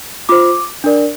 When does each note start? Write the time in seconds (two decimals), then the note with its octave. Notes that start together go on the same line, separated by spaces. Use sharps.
0.29 F4 C5 D6
0.84 D4 A#4 D5